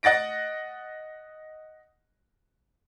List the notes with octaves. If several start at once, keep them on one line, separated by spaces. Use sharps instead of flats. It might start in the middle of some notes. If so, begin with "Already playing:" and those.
D#5 F#5 A6 A#6 D7